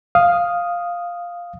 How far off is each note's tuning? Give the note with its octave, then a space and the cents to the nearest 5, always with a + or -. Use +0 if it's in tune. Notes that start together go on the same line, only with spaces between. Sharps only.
F5 +0 D#6 +0